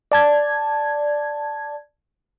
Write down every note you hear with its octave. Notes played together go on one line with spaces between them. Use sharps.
D5 A5 G#6